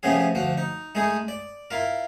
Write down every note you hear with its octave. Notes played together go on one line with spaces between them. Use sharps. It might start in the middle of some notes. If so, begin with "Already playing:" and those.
C3 F3 A3 B3 C#4 G#4
D2 F3 F#4
D#4
G#3 A3 D#4 G#4
D5
E4 F4 A#4